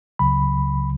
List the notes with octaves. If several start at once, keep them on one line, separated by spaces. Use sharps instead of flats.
C#2 C#3 F#3 B5